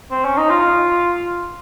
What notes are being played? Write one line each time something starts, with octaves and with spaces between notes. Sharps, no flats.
C4
C#4
D#4
F4